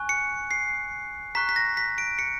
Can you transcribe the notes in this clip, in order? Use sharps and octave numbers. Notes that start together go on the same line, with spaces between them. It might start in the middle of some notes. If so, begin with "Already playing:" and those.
Already playing: G#5 C#6 F#6
C#7
C7
A#5 C#6 F#6 B6
B6
A#6
B6
D7
C#7